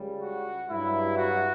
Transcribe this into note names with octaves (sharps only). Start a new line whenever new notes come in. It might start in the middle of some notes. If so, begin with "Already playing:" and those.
Already playing: C#2 C#3 G3
F#4
G2 F#3 E4
F#4